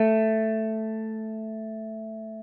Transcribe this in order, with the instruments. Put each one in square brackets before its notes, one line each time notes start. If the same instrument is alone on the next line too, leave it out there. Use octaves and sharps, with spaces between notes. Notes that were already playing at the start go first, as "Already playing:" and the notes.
Already playing: [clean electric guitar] A3